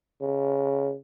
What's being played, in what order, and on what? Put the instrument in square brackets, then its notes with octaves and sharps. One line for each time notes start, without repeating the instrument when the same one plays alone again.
[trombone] C#3